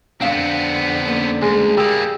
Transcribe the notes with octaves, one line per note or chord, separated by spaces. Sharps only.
F2 D3 B3 C4 D4 F5
A#3 C#4 B4
D2 G#3
G3 A#3 G4 D#6 E6